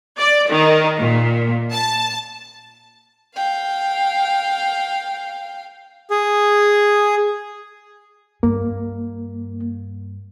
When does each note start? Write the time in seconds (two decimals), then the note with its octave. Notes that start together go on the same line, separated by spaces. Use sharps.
0.19 D5
0.49 D#3
1.00 A#2
1.72 A5
3.36 F5 G5
6.10 G#4
8.43 G2 A#3